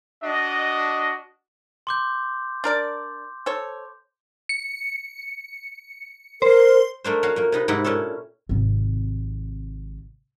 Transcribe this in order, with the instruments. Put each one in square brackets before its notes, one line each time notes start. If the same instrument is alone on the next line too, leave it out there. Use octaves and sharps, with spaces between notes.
[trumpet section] D4 F#4 D#5
[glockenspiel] C6 D6 G6
[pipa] D4 A#4 D5
A4 C5 C#5
[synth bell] C#7
[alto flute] A#4 [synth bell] C5
[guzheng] A3 A#3 D4 C5
C#4 F#4 F5
A#2 A#3
C3 D#4 B4
G#2 C3 D#4 E4 G4 F#5
A#2 C#4 D4 A4
[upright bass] G#1 C3